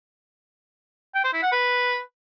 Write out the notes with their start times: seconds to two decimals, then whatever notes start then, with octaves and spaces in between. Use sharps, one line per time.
1.15 G5
1.24 C5
1.33 E4
1.42 F#5
1.52 B4